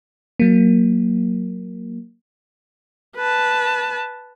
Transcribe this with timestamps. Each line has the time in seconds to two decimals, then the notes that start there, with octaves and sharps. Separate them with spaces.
0.40 F#3 A#3
3.17 B4 A5